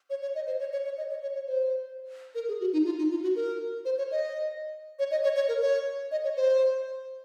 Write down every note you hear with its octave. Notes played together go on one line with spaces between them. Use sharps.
C#5
C#5
D#5
C5
C#5
C#5
C#5
D#5
C#5
C#5
C#5
C5
A#4
G#4
F#4
D#4
F4
D#4
F4
F#4
A#4
C5
C#5
D#5
C#5
D#5
C#5
C#5
A#4
C#5
D#5
C#5
C5